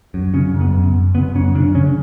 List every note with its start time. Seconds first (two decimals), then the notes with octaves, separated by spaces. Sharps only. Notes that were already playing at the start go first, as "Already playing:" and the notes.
0.14 F#2
0.34 C#3 C#4
0.54 F#2
0.61 B3
0.74 F#2
0.94 F#2
1.15 C#3 B3
1.35 F#2 C#4
1.55 C#3 D4
1.75 C#3 C#4